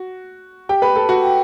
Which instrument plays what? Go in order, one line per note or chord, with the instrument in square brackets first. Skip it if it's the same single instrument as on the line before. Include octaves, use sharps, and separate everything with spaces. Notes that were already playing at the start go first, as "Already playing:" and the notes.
Already playing: [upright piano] F#4
G4 G5
B4 B5
A4 A5
F#4 F#5
[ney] G5